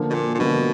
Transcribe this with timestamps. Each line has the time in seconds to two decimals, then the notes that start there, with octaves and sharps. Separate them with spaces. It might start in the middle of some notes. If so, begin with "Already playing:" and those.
Already playing: D3 F3 A#3
0.10 B2
0.14 A#2
0.35 A#2
0.39 B2 D3 F3 A#3